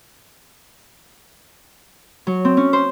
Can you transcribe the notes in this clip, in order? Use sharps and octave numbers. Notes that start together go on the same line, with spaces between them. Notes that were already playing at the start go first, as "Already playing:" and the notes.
F#3
C4
C#4
C5